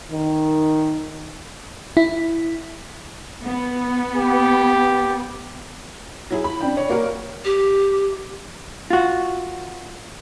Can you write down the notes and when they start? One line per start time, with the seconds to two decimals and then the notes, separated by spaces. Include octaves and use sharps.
0.11 D#3
1.97 E4
3.44 B3
4.16 G4
6.30 F#3 E4 G#4
6.44 B5
6.61 C4 D4 G5
6.77 C#5 D5
6.89 A#3 F#4 A#4
7.45 G4
8.90 F4 F#4